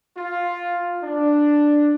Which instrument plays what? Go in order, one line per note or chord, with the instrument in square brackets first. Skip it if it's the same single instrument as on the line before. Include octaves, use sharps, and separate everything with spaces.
[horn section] F4
D4